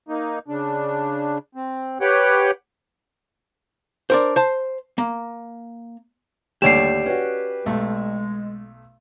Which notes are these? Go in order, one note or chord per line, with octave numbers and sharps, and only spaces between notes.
A#3 D#4
C#3 D4
C4
G4 B4 C#5 F#5 G5
D4 A#4 C5
C5 A5
A#3
D#2 A2 D3 G4 C#5 D5 C7 E7
C#4 F#4 B4
B1 G#3 A3